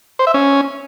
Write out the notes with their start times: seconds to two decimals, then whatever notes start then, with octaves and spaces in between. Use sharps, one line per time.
0.19 C5
0.27 E5
0.34 C#4